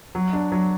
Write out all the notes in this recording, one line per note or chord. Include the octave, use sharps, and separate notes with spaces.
F#3
D4
F#3